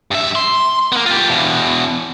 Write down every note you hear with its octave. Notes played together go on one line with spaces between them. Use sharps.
G2 E5
C6
A#3 B3
F4 G4
E2 B2